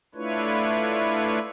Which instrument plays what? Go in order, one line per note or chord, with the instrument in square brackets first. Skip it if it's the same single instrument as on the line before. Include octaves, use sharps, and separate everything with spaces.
[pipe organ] A3 D4 E4 F4 B4 C#5